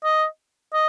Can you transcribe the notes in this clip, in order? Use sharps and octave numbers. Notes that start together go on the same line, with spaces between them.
D#5
D#5